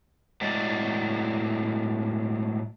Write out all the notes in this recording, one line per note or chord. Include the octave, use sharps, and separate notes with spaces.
A2 F#3 G#3 D5